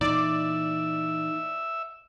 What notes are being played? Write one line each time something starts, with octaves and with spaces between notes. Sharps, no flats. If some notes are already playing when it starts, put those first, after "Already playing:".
A#2 E3 D#4 D5 E5